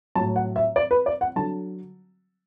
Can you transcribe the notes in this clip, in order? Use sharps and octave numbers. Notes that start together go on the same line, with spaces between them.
A2 F#3 A5
F#5
E5
D5
B4
D5
F#5
D3 F#3 A5